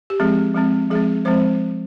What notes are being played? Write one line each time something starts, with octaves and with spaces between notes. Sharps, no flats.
G4
F3 G#3 C4 G#4
F3 G#3 C4
F3 G#3 C4 G#4
F3 G#3 C4 C5